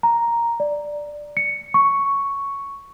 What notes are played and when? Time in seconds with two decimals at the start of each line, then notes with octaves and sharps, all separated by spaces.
0.03 A#5
0.60 D5
1.37 C#7
1.74 C#6